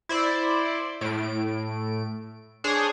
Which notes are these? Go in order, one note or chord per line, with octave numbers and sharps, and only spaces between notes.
E4 C5 D5
A2 D7
D4 G#4 C5 C#5